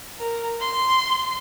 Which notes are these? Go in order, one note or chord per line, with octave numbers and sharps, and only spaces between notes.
A#4
C6